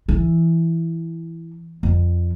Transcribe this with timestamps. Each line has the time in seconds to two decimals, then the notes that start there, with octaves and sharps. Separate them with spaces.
0.09 E3
1.83 F2